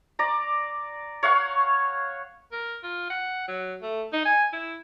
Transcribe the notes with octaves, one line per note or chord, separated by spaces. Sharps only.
D5 A#5
C#5 F5 F#5 C#6
A#4
F4
F#5
F#3
A3
D#4
G#5
E4